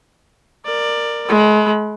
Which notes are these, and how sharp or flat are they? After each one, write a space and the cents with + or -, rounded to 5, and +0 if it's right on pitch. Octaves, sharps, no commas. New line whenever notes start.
A#4 +0 D5 +15
G#3 +35 B5 +0